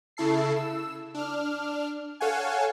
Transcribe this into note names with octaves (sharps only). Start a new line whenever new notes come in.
C#3 E4 A4 C7
E6
D4 F6
A4 C#5 F5 F#5 G#5